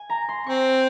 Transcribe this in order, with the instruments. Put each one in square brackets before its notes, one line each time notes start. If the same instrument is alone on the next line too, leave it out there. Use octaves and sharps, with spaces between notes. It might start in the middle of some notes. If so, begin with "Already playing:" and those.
Already playing: [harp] G#5
A#5
C6
[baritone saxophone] C4 [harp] C#6